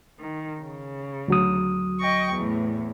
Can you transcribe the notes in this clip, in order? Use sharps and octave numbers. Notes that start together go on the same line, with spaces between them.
D#3
C#3
D2 F#3 D#6
D#5 G5 C#6
E2 A2